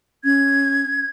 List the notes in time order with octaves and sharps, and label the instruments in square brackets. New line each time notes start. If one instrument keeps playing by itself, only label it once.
[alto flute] C#4 [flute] G#6